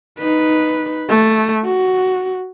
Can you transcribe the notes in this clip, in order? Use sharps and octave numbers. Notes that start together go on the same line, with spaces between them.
D#4 B4
A3
F#4